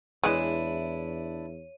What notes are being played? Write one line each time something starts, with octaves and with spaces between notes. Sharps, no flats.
E2 E3 G#3 D4 E4 C#5 D#7